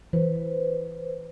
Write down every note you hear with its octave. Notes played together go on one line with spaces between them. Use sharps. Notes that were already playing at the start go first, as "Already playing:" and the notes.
E3 B4 C5